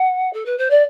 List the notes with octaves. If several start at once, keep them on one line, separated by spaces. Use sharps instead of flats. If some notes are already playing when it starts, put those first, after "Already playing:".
Already playing: F#5
A4
B4
C5
D5